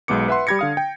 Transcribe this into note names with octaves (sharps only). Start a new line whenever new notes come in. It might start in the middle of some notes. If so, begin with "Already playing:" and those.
B1 G#3 B3 D6 C#7
B4 E5 F#5 C6
G3 G4 B5 G#6 A#6 C#7
D3 F5 D#6
G5